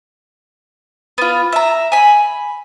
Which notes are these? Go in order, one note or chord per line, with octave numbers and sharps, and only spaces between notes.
B3 F4
E5 A#5
G#5 B5